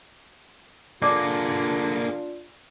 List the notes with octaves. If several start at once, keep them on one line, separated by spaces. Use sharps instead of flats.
D3 A#3 D4 F4 G#4 D5 D6